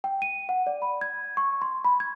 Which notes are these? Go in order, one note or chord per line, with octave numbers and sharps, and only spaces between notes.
G5
D#7
F#5
D5
B5
G#6
C#6
C6
B5
G#6